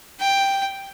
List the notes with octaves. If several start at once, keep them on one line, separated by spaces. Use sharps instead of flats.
G5